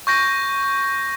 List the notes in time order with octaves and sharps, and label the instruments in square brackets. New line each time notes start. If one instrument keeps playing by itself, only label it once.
[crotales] C#6 G6 A#6